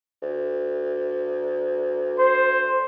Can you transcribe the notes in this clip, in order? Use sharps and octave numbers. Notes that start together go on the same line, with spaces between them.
D2
C5